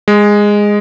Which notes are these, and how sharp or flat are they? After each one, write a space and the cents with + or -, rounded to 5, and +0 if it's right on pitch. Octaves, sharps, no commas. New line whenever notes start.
G#3 -10